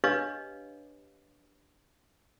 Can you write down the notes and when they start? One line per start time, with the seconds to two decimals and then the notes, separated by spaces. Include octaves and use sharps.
0.04 D4 G4 B4 C#5 D#5 F5